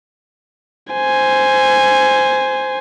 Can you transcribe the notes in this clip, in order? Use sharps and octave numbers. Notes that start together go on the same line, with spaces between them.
C5 G#5